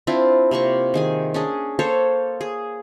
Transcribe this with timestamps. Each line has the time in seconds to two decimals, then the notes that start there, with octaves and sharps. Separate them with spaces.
0.07 C4 D4 E4 F4
0.51 C3 A#3 C6 C#6
0.94 D#3 G#4 G#5
1.34 C#4 D4 G#4
1.79 A#3 A4 C5 C#5
2.41 G#4